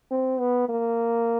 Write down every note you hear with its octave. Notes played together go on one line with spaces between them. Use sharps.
C4
B3
A#3